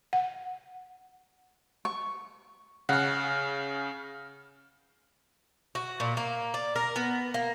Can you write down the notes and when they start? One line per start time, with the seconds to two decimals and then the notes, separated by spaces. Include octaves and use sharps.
0.13 F#5
1.85 C#6
2.89 C#3 F#5 F6
5.75 F#4
6.00 A#2
6.17 A#3
6.54 D5
6.76 A#4
6.96 B3
7.34 A#3